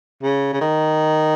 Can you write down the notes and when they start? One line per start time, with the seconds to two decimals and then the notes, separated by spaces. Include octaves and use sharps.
0.23 C#3
0.53 C#3
0.61 D#3